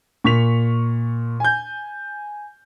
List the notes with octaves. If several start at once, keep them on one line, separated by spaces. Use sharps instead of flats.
A#2 C#6 B6 F7
G#5 G6